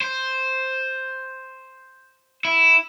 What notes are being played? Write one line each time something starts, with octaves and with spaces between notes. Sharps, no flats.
C5
E4